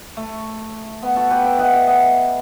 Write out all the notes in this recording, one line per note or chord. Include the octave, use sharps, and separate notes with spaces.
A3
B3
F#4 A4
G4 B4
E5 G5
D#5 F#5
E5 G5
D#5 F#5